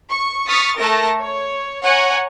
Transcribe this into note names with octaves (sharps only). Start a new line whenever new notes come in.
C#6
C#6 D#6 F6 A6 B6
A3 A#4 A5 A#6
C#5
C#5 F#5 G#5 A#5